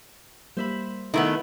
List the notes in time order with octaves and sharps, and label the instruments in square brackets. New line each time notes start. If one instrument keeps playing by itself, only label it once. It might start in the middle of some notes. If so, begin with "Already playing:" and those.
[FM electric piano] G3 A#3 [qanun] C5 E5 B5
[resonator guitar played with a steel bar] D#3 A3 B3 [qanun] E4